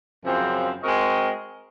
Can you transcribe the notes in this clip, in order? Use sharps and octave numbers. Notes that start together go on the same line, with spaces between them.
F#2 C#3 F3 C4
G#3 C4 F#4 A#4 D#5